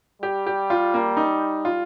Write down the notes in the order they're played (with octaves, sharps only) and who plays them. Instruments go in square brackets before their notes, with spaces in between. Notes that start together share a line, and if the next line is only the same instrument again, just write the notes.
[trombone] G3 [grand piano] G4
[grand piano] G4
F4
A#3
D#4
F4